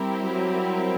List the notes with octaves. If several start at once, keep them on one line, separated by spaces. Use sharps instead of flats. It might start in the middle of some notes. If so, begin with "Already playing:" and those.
Already playing: G3 C4 E4 G4 A#4
F#3